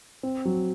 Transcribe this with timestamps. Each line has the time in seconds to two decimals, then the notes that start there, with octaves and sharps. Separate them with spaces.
0.23 C4
0.45 F#3